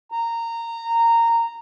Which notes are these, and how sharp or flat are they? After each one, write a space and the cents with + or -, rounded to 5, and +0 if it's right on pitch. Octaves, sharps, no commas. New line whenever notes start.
A#5 -15